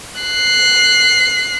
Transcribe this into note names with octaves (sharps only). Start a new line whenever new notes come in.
F#6 C7